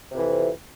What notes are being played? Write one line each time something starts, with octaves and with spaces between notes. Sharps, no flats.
F2 C3 E3